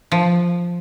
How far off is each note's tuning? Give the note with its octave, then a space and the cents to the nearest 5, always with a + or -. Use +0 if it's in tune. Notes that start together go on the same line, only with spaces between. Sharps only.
F3 +0